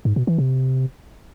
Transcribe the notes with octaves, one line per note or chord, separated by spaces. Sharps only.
G#2
B2
E3
C3